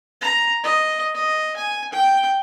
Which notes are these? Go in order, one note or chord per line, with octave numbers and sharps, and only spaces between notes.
A#5
D#5
D#5
G#5
G5